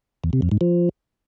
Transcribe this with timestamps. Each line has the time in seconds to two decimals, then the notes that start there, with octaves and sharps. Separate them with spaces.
0.24 E2
0.33 C3
0.42 F2
0.52 G#2
0.61 F3